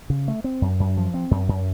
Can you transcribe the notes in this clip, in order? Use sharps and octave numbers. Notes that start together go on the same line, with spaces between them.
C#3
A3
C4
F#2
F#2
F3
C4
F#2
F#2